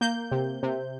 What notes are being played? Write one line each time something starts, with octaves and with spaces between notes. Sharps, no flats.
A#3 G6
C3
C3